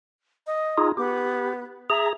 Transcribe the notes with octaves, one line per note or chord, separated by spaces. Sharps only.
D#5
D#4 F4 G#4
B3 G4
G#4 E5 A#5